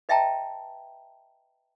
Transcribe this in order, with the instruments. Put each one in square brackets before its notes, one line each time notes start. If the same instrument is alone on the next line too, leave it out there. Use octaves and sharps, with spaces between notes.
[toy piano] B4 D#5 E5 G5 A5 A#5